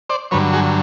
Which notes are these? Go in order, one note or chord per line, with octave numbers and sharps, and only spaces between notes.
C5 D5
G2 D3 F#3 B4 C#5
F#4 G#4